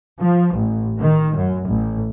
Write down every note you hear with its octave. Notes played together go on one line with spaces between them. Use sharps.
F3
A1
D#3
F#2
A1